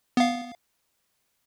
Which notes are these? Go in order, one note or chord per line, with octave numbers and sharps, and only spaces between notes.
B3 F5